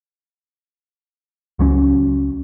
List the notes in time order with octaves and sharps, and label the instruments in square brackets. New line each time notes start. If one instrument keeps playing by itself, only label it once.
[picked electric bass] C#2 F#3 C#4